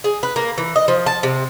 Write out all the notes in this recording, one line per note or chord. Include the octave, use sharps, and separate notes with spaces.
G#4
B4
A#3
E3
D#5
F3
A5
C3